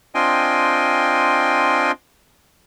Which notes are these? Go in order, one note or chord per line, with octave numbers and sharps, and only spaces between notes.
C4 D4 F4 D#5 G5 G#5